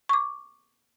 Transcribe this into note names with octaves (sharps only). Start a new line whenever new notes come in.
C#6 D6